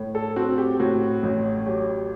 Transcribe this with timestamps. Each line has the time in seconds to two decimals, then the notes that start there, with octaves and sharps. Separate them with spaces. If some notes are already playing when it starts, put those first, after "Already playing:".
Already playing: A2
0.15 A4
0.36 C4 F#4
0.58 G4
0.80 A2 F#4
1.23 A1
1.66 F#3 G4